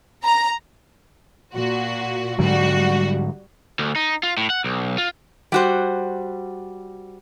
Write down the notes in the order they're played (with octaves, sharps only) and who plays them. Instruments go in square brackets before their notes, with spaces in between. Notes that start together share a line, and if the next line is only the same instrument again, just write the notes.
[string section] A#5
A#2 F#4
[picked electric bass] G#2 D3 F#3 [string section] G3 F#4
[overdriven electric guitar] D2
D#4
F4
A2
F#5
B1
F4
[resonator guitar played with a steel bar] G3 F#4 C5